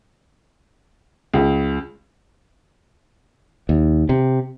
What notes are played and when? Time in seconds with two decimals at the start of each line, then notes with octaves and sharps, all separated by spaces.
1.33 C#2
3.69 D#2
4.09 C3